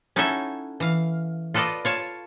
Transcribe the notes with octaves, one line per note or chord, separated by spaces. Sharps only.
C#4 D#4 E4 F#4 A4 E5
E3 F5
F4 A4 B4 D5 D#5
F4 C#5 A5